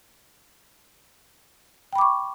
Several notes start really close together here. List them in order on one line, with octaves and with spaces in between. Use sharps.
G5 B5 D6 C#6